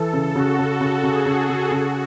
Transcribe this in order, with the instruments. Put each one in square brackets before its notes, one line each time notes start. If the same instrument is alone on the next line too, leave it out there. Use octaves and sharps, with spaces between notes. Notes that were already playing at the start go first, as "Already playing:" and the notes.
Already playing: [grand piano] E3 [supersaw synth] A4
[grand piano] C#3
[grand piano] C#3 [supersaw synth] F#4
[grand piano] C#3
[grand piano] C#3 [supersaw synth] F#4
[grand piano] C#3
[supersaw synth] G#4
[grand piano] C#3
[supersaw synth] A4
[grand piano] C#3
[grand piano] C#3 [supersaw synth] F#4